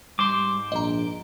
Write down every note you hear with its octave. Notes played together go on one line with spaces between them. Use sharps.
G#2 G3 C5 C6 D6
A#1 D#5 A#5